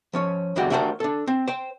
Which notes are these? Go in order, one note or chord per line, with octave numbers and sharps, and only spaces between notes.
F3 C#4 C#5
E2 D3 G3 G#3 F#4 G5
A3 D4 F#4 G4 A#4 C5
D4 A4
C4
C5 G5